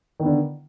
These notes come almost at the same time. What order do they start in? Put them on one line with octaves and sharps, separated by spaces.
D#3 B3 D3